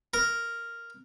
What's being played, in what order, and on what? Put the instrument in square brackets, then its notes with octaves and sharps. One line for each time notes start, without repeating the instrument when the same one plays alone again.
[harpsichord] A#4